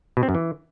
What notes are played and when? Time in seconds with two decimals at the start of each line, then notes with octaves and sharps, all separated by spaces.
0.17 B2
0.23 C4
0.29 F#2
0.35 E3